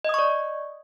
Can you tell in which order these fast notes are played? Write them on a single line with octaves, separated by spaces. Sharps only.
D#5 D#6 C#6 D5